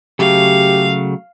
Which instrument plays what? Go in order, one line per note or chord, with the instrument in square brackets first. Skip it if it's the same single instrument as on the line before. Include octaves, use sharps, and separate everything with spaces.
[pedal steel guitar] C#3 F#3 A3 [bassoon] G4 [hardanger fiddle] F5